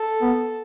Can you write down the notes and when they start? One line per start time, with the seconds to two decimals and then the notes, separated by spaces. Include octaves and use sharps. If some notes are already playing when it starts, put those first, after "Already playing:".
Already playing: A4
0.21 B3